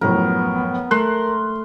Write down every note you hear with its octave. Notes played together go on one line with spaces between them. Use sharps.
F#2 A2 F3 B3 A#4
A3 A#4 C6 F#6